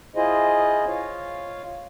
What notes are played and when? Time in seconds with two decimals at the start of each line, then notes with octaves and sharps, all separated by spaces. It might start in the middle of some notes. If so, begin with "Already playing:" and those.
0.16 E4 F4 G#4 C5 D#5
0.87 F4 C#5 F5